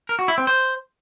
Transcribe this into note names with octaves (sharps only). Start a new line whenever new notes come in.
A#4
F#4
E4
C4
C5